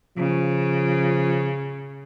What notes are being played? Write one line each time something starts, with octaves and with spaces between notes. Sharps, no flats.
C#3 F3